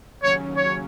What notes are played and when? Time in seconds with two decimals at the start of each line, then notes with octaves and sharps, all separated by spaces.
0.21 D#2 C#3 F#3 C#4 C#5
0.56 C#5